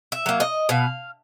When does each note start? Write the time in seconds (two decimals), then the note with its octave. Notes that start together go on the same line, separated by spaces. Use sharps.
0.12 E5
0.26 F#3 A#3
0.40 D#5
0.69 B2 F5